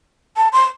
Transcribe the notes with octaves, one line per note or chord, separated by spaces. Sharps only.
A5
C6